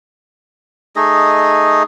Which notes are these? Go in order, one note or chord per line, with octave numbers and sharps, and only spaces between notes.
A3 D#4 G#4 D#5